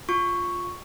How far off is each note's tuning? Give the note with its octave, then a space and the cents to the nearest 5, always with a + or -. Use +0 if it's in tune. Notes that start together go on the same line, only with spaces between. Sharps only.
F4 +10 C#6 +0